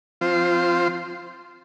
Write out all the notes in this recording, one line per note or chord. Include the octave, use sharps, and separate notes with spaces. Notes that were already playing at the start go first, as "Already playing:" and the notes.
F3 C4 F4 C5